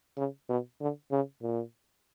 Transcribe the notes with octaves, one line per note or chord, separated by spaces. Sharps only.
C#3
B2
D3
C#3
A#2